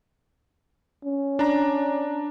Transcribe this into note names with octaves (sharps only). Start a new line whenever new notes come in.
C#4
D4 A#5